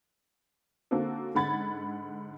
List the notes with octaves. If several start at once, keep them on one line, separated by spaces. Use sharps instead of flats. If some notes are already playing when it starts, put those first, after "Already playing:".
D3 A#3 C4 F#4 A4
G#2 D3 F#5 B5 G#6 A6